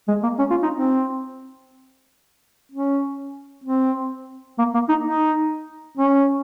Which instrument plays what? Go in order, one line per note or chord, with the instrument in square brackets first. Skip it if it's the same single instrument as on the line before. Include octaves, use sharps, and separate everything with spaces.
[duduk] G#3
A#3
C#4
F4
D#4
C4
C#4
C4
A#3
A#3
D#4
D#4
C#4